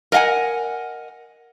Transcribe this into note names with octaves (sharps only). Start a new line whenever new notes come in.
A#4 D#5 F5 F#5 G#5